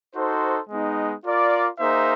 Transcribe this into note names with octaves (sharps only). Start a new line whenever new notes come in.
D#4 F#4 A4 C5
G#3 B3 D#4
F4 A#4 D5
A#3 D#4 G#4 C5 E5